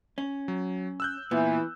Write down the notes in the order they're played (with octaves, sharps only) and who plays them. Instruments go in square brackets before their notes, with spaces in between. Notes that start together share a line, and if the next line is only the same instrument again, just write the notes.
[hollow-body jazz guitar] C#4
[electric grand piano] F#3
E6 F#6 G6
[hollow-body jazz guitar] A#2 [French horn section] E3 [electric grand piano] B3